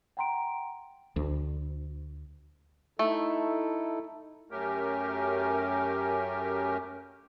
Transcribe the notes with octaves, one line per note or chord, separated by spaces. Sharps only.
F#5 G5 A#5 C6 D7
D2
A3 D#4 E4 A4
F#2 A3 C#4 G4 A#4